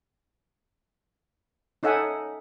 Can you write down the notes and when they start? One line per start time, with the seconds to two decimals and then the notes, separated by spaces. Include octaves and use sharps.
1.83 C#4 D#4 A4 E5 F#5 G#5